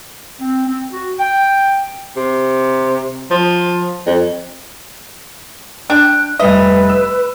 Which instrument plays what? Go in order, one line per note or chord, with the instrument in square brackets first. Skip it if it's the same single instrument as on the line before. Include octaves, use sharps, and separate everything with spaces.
[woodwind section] C4
C4
F#4
G5
[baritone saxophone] C3
F3
F2
[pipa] D4 [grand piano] G5 [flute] F#6
[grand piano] F1 G3 E5 [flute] B4 [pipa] D#5
[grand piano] E6